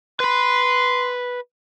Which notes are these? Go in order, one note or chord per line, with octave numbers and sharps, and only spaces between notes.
B4 B5 C6